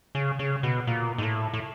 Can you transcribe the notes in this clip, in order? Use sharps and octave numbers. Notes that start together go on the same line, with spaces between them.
C#3
C#3
B2
A#2
G#2
A2
A2